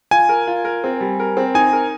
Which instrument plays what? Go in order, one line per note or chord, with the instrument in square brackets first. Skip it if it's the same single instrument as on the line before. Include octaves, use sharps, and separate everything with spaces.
[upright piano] F4 [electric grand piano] G#5
[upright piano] A#4
F4
A#4
C4
G3
A#4
C4
[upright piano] D#4 [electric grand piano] G#5
[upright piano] A#4